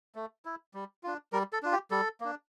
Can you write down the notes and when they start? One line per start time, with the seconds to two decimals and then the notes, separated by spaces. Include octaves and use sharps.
0.15 A3
0.45 E4
0.74 G3
1.03 D4 F4
1.33 G3 A#4
1.53 A4
1.63 D4 F4
1.73 G4
1.91 G3 A4
2.21 A#3 D4